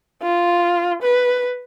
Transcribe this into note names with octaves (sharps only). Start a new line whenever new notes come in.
F4
B4